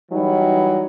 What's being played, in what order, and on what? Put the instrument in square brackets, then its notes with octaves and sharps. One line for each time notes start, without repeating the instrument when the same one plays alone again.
[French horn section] E3 F#3 G3 D#4